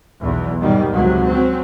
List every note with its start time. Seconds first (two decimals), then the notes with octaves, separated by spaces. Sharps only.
0.21 B1 E2
0.61 G#2 B2 D#3 G3
0.92 C#2 C3 F#3
1.27 F#3 C4 C#4